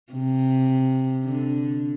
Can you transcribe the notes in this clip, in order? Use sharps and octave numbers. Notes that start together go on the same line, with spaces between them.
C3
D3